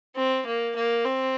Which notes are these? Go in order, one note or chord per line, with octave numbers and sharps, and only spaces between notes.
C4
A#3
A#3
C4